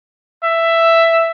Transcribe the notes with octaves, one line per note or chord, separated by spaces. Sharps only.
E5